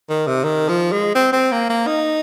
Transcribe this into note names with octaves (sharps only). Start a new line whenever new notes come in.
D#3
C3
D#3
F3
G#3
C4
C4
A#3
A#3
D#4